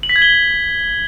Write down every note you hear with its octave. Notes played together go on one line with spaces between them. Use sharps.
F#7
B6
G#6
G7